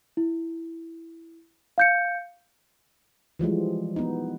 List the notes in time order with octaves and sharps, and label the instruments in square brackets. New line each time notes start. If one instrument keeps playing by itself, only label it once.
[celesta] E4
F5 G6 C#7
[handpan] E3 F3 G3 G#3
B3 D#4